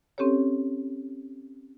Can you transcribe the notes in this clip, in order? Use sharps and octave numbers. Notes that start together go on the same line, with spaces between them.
C4 C#4 G4 A4 C#5